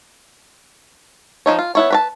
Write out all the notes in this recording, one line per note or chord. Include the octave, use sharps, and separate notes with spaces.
F3 D4 D#4 C#5
F4
B3 E4 C#5
B4 C#5 A5